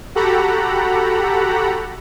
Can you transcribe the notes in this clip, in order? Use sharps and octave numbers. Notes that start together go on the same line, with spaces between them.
F#4 G4 A4 F#5 A#5 B5